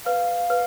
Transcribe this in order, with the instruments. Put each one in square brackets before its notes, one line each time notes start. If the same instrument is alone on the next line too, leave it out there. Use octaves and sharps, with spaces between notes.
[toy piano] B4 [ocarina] F5
[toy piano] B4